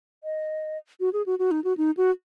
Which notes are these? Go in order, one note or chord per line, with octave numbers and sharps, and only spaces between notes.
D#5
F#4
G#4
F#4
F#4
D#4
F#4
D#4
F#4